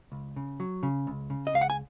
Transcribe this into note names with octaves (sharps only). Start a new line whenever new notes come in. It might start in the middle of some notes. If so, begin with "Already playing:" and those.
C#2
C#3
F#3
C#3
C#2
C#3
D#5
C#2 F5
F#5
G#5